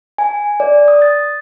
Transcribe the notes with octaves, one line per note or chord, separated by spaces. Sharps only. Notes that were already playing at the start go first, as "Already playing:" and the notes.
G#5
D5
D#6
A6